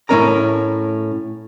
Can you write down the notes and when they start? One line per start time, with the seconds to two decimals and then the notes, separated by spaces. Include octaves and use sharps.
0.09 A2 A3 A#3 C#4 A#4 A#5